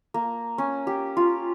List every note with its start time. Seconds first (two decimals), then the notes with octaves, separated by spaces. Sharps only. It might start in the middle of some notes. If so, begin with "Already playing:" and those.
0.14 A#3
0.58 C#4
0.87 G4
1.17 F4